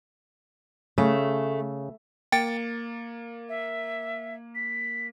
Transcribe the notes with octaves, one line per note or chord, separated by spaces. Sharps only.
C#3 A3
A#3 G5 A6 C#7
E5
B6